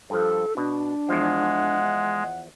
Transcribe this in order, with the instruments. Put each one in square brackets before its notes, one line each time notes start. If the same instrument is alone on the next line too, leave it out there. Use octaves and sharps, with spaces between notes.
[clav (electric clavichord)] G2 F3 [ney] A4
[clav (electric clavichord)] B2 [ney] D4
[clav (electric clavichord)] E2 F3 [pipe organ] G#3 [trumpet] F#5